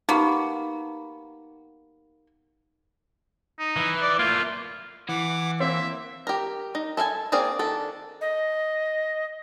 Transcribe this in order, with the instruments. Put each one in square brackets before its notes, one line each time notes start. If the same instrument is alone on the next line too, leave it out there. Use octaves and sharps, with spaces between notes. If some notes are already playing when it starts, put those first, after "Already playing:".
[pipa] A#3 B3 [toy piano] D#4 G4
[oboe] D#4
[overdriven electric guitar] E3
[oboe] D5
[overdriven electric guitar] A3 A#3 [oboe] F4
[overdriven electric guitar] E3 [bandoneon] F#5 D6
[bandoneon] A#3 [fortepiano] C4 [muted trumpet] E5
[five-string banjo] G4 A#4
D#4
A4 E5 F5 G#5 A5
A#3 C4 G#4 D5 F5
D#3 D4 A4
[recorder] D#5